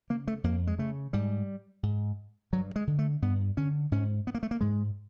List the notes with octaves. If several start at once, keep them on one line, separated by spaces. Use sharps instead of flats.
C#3 A#3
A3
F2 A#3
G#3
C#3 A3
G#2 G3
G#2
G2 F#3
G#3
D3
A3
G2 B3
D3 C#4
G#2 C#4
B3
A#3
A3
A#3
G#2 G#3